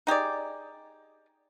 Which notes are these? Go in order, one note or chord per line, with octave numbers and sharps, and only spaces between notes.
D#4 G4 G#4 D5